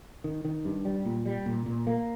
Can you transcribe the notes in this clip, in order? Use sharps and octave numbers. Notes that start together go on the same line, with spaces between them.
D#3
D#3
G2
G3
A#2
G3
A#2
A#2
A#3